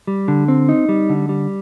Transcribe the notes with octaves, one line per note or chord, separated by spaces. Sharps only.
G3
D3
C4
D#4
G3
D3
G3